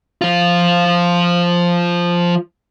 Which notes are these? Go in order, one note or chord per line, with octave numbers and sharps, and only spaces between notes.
F3 F4